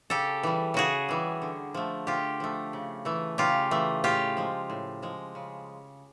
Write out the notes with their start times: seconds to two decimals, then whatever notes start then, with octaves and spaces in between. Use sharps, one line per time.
0.10 C#3 G4 A4
0.43 E3 G3
0.74 C#3 F#4 G#4
1.09 E3 G3
1.42 D3
1.74 F3 A3
2.07 D3 F4 G4
2.40 F3 A3
2.73 C#3
3.05 E3 A3
3.38 C#3 F4 G4
3.71 E3 A3
4.04 A2 F4 G4
4.37 F3 G#3
4.70 A2
5.02 F3 G#3
5.35 C#3